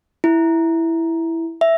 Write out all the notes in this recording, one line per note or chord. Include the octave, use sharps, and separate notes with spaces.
E4
E5